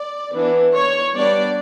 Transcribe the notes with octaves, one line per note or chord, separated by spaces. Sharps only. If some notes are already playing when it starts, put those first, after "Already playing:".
Already playing: D5
E3 B3 D4
C#5
G3 B3 D4 D5